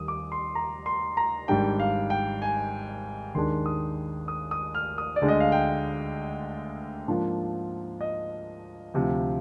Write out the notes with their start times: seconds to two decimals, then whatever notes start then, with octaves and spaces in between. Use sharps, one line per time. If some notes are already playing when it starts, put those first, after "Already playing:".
Already playing: D#2 D#3 G3 D#6
0.08 D6
0.32 C6
0.55 A#5
0.86 C6
1.17 A#5
1.48 G#1 G#2 G3 D4 G5
1.79 F5
2.10 G5
2.42 G#5
3.34 D#2 D#3 G#3 D4 C6
3.66 D#6
4.28 D#6
4.51 D#6
4.75 F6
4.98 D#6
5.16 D5
5.21 D2 D3 G#3
5.28 D#5
5.40 F5
5.52 G5
7.08 G#2 F3 A#3 D4 F4
8.01 D#5
8.94 D2 C3 F3